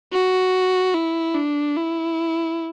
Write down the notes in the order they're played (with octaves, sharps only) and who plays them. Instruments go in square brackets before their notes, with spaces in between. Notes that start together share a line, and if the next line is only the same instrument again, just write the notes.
[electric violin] F#4
E4
D4
E4